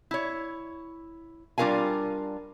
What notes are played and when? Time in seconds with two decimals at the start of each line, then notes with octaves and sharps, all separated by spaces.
0.11 E4 C#5
1.58 G3 D4 F4 A#4 F5 G#5